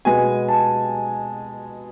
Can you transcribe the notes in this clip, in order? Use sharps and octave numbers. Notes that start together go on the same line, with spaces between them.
B2 G#3 B3 G#5
A5